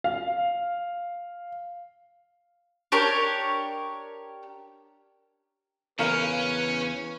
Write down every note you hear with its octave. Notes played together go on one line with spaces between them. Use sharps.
F5
D4 G4 A#4 C#5
E2 C#3 C#4 A#4 B4 F5